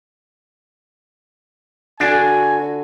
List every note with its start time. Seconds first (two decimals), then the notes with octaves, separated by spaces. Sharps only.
2.00 D3 D4 F#4 G#5